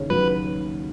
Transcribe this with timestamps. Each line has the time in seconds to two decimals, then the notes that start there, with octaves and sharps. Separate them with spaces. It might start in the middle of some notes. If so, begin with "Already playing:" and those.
Already playing: D#2 C#3 C#4
0.10 F#3 B4